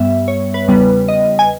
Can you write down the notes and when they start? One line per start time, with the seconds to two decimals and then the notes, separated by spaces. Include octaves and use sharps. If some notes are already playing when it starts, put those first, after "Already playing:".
Already playing: G2 G3 B3 E5
0.28 C#5
0.54 B4
0.68 E2 C#3 G3 B3
1.08 D#5
1.39 G#5